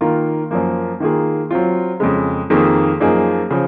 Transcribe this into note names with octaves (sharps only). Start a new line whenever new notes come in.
D#3 A#3 F4 A#4
F#2 F3 A#3
D#3 A#3 F4 G#4
F#3 C4 F4
F2 C#3 G#3
F2 D#3 A#3 F4 G#4
F#2 F3 A#3 D#4 G#4
C#3 F3